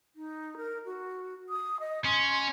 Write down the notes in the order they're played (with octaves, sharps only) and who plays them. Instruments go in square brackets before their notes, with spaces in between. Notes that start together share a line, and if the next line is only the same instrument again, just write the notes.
[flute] D#4
A#4
F#4
D#6
D#5
[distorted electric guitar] C#4 [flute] C6